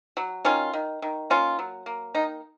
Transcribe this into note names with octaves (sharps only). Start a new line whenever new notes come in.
F#3
D#3 C#4 F4
D#3
D#3
A#3 C#4 F4
F#3
A#3
D#3 D#4